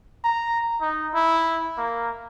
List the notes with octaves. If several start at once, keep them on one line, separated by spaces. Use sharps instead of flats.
A#5
D#4
E4
A#3